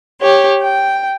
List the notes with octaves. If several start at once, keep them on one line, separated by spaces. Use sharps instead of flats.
G4 C#5
G5